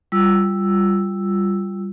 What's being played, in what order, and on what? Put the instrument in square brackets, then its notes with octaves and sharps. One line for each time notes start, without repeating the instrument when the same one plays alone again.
[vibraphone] G3 F4 E6